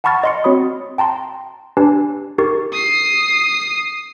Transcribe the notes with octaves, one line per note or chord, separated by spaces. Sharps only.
F#5 A5 B5 C#6 F6 A6
D#5 C6 C#7
C4 F#4 C#5 B5 D#6
G5 A5 A#5 C6
D4 G4 B4 G#5 A5
D#4 G4 A#4 C#6 A6
D#6 C7